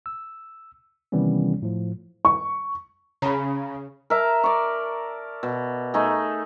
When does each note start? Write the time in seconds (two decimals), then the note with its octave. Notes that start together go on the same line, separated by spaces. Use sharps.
0.06 E6
1.12 C3 D#3 E3 G3 B3 C#4
1.62 A2 F3
2.25 C#6
3.22 C#3 A#5 B5
4.10 A#4 E5 A5
4.44 D5 C#6
5.43 B2
5.94 A3 D#4 G#4